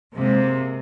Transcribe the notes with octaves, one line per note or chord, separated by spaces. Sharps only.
C3 G#3 A#3